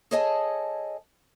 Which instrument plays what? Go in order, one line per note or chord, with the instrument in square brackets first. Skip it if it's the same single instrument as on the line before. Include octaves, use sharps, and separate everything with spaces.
[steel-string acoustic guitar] G#4 A4 C#5 D#5 G#5 A5